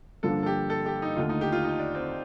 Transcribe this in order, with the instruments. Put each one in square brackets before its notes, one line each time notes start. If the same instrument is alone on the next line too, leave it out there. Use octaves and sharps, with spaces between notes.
[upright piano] G2 D3 F3 A#3 D4 [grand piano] A4
[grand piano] A4
G4
A4
G4
D#4
[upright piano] D#2 D3 A3 [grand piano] F4
[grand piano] D#4
G4
F4
D#4
D4
C4